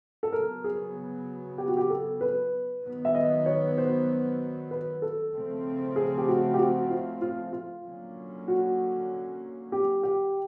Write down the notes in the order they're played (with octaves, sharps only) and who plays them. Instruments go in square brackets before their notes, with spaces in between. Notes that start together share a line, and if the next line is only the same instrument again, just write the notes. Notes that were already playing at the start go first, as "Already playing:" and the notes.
[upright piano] A4
[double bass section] C#3 F#3 B3 [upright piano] A#4
[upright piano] G#4
G4
F#4
G4
A4
B4
[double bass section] D#3 F#3 B3
[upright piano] E5
D#5
C#5
C5
B4
A4
[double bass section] C#3 F3 A3 C4
[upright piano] G#4
G4
F#4
G4
F#4
F4
F4
F4
[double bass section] D3 F#3 A#3 C#4
[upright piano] F#4
G4
G4